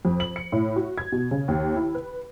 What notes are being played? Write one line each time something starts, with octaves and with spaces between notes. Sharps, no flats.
F2
F#7
C#7
A2
F#4
G#6
B2
C#3
D#2
E4
B4